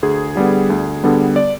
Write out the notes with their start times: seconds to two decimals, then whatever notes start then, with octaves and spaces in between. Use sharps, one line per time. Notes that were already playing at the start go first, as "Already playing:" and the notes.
0.03 D2 G#4
0.36 D3 G3 B3
0.70 D2
1.04 D3 G3 B3
1.36 D5